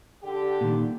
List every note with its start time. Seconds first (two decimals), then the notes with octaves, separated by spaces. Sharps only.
0.24 D3 G4
0.61 A#2 D#3